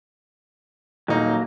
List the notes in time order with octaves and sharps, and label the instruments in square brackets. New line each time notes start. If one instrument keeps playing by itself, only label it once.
[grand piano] D#1 D#4 [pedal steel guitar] F#3 A#3